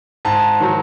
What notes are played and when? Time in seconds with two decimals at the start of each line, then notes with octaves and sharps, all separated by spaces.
0.25 G#2 A5
0.60 D#3 F#3